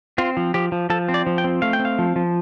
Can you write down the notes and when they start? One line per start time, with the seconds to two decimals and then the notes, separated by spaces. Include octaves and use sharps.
0.18 C4 F4
0.37 F3
0.54 F3 G4
0.72 F3
0.90 F3 A4
1.08 C4
1.14 D5
1.27 F3
1.38 G5
1.44 C4
1.62 A3 F5
1.73 G5
1.80 C4
1.85 F5
1.99 F3
2.16 F3